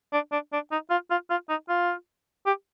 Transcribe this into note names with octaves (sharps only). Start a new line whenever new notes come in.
D4
D4
D4
D#4
F4
F4
F4
D#4
F4
G4